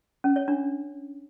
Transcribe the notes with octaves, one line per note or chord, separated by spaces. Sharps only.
C#4
C#5
D4